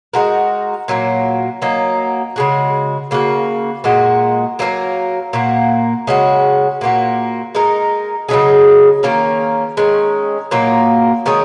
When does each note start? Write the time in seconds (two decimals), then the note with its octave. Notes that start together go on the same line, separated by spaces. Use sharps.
0.13 G#3 D#4 F#4 A#4
0.88 A#2 F#3 A#3
1.62 F#3 A#3 D#4
2.36 C#3 G#3 F#4
3.11 C#3 A#3 F#4
3.84 A#2 G#3 F#4
4.59 F#3 A#3 D#4 A#4
5.33 A#2 A#3 F#4
6.07 C#3 G#3 C#4 F#4
6.81 A#2 A#3 F#4
7.55 G#3 D#4 A#4
8.29 C#3 F#3 D#4 G#4
9.03 D#3 A#3 C#4 A#4
9.77 D#3 G#3 C#4
10.51 A#2 F#3 A#3 D#4
11.26 D#3 G#3 C#4 G#4